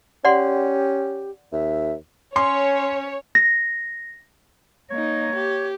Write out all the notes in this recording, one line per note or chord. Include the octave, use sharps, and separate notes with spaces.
C#4 G4 D5 F#5 C6
D#2 E5
C#4 C#5 C6
A#6
A#3 D#4 C#5
G4